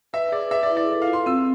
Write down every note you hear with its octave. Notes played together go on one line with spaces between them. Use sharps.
B4 E5
G#4 D5
B4 E5
D5
E4
D5
A4
F5
F4
C6
C4 E6